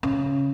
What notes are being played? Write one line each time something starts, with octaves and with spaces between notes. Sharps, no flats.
C#3